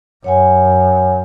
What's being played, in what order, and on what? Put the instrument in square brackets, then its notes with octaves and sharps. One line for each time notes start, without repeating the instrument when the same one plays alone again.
[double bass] F#2 [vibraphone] C#5 F#5 G#5